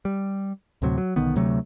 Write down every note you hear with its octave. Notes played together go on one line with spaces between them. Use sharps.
G3
D2 A2 C3 F#3
F#3
B1 D3 D#3 B3
D2 C3 F#3 A3